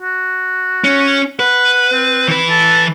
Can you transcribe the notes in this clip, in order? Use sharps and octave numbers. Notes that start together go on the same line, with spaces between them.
F#4
C#4
B4 F#5
C4
E3 B4
A4